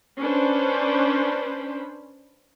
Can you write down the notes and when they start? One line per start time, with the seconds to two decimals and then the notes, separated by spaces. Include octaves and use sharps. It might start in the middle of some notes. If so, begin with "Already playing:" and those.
0.20 C#4 D4 B4 C5